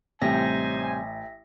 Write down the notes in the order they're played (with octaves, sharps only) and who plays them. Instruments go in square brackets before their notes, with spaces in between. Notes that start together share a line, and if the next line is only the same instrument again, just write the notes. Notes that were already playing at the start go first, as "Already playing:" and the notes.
[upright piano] A1 [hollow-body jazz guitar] C3 G3 [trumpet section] D#4 C5 G#5 [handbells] E5 A#6